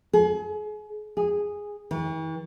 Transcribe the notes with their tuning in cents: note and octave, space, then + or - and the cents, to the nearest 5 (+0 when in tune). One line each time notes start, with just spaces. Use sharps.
G#4 +35
G#4 -10
E3 -45